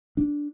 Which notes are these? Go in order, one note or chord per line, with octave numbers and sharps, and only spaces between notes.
D4